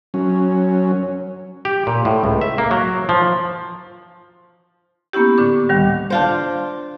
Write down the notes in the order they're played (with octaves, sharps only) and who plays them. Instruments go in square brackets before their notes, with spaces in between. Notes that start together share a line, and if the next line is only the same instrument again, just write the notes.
[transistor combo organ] F#3 C#4
[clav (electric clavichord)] G4
A#2
A2
C#2
E5
A#3
F#3
F3
[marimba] A#3 B3 C#4 E4 G4
A2 D3 D6
D2 D#3 G3
[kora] D4 F4 C5